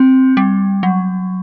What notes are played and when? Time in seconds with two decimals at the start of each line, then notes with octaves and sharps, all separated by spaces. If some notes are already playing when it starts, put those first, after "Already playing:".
Already playing: C4
0.37 G3
0.83 F#3